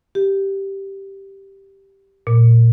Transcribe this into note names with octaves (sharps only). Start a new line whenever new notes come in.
G4
A#2